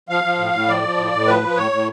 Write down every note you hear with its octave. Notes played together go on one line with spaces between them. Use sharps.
F3 F5
F3
A2
A2
F3 D5
F3
A2
A2
F3 B4
F3
A2 C#5
A2